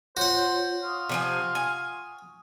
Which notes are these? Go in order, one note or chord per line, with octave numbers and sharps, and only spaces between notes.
F4 F#4 C5 C#5 F#5
F4 C#6 D#6
C3 F3 G#5
G#5